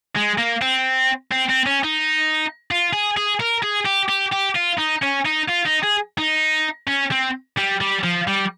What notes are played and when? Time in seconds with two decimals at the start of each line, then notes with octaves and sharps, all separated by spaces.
0.16 G#3
0.38 A#3
0.62 C4
1.31 C4
1.49 C4
1.66 C#4
1.84 D#4
2.71 F4
2.93 G#4
3.17 G#4
3.41 A#4
3.63 G#4
3.86 G4
4.09 G4
4.33 G4
4.56 F4
4.79 D#4
5.03 C#4
5.26 D#4
5.49 F4
5.67 D#4
5.84 G#4
6.18 D#4
6.88 C#4
7.12 C4
7.58 G3
7.81 G3
8.04 F3
8.28 G3